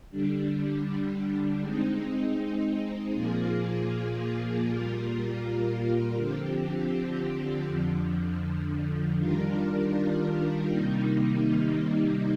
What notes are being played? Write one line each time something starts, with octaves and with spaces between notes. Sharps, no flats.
D3 G3 D4
G#3 C4 D#4
A#2 F3 A#3 F4 G#4
A#2 G3 A#3 F4 A#4
D3 F3 C4 G4
F2 D3 F3
D#3 G3 D4 F4 A#4
C3 D#3 G3 A#3 D#4